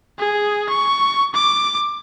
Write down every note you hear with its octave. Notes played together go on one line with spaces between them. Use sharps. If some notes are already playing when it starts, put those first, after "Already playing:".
G#4
C#6
D6